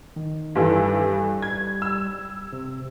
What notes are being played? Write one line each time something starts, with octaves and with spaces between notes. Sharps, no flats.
D#3
G2 E3 A4
G3
G#6
E6
C3